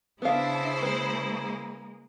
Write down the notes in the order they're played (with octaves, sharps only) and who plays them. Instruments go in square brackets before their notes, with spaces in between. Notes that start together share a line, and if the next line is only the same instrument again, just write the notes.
[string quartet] C#3 E4 C5 [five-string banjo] B3 F5 [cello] D4 E5
[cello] G#3 A#3 [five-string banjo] B4